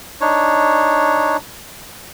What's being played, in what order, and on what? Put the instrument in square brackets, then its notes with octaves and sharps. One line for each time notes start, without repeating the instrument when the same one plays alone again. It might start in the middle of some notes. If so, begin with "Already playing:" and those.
[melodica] D4 D#4 C#5